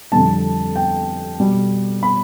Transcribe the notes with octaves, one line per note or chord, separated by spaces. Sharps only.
F2 D3 G3 A5
G5
B2 G3
B5